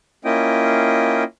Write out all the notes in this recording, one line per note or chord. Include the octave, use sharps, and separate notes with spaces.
A#3 C#4 E4 F4 D#5 G5